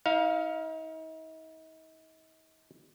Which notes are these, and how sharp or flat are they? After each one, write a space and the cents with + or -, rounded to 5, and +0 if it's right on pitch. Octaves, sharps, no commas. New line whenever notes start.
D#4 +40 F5 +0